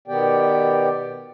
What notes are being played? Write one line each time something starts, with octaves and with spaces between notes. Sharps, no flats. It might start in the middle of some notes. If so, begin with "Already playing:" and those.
B2 D#3 B3 G4 D5 G5